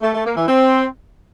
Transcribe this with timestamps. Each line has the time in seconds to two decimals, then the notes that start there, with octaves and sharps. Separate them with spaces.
0.02 A3
0.13 A3
0.25 A#3
0.36 E3
0.47 C4